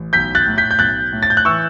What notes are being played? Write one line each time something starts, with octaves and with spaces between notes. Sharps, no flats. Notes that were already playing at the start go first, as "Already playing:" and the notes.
Already playing: A1
B1 G6 B6
F#6 A6
A2
G6 B6
G6
B1 F#6 A6
A2
A6
G6
F#6
E3 C#6 E6